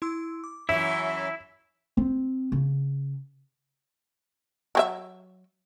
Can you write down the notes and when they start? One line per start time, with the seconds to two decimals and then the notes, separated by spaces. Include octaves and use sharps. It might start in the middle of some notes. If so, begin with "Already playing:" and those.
0.02 E4 C6 E6
0.44 D6
0.69 F#2 E3 C#4 E4 E5
1.97 C4
2.52 C#3
4.75 F#3 G4 E5